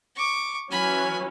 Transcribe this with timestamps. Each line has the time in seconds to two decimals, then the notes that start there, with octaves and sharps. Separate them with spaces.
0.15 C#6 D6
0.71 E3 F#3 C#4 G#5 B5